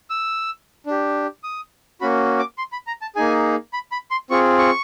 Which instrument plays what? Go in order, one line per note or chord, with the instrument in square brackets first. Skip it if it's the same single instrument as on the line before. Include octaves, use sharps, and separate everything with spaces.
[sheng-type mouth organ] E6
D4 G4
D#6
A#3 C#4 F#4 B5
D6
C6
B5
A#5
A5
A#3 D#4 G#4 G#5
B5
B5
C6
C4 F4 G#4 C#6
C#6